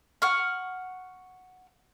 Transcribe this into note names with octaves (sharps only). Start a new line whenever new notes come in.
F#5 C#6 F6